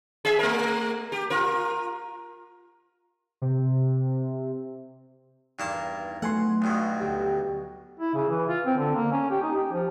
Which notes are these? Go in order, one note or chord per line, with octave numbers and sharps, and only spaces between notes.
G#4 E5
A3 A#4
G4
F4 A#4
C3
E2 G2 A#3 D#4 A5
F#3 A3 B3 F#4 F#5 G#5 C6
B1 G2 B2
D2 G4 E6 G6
E4
C#3
E3
F4
C4
D3
A#3
C#4
G4
D#4
G4
F3